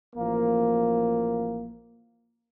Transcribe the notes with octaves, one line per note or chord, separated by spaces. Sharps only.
A1 F3 A#3